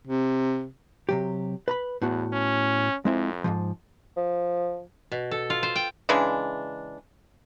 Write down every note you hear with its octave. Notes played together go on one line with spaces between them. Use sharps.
C3
C3 F#3 G4
B4 A#5 B5
E2 A2 B3 F#4
C#4
F2 G#3 C4 E4
G#2 E3 F3
F3
B2
A4
F4
C5
G5
C#3 E3 G#3 D4